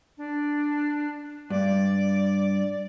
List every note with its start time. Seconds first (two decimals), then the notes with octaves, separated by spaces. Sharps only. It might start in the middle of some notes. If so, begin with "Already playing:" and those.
0.18 D4
1.50 G2 D5